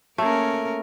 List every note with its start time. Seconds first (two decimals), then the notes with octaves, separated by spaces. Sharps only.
0.18 A3 A#3 C#4 G#4 A#4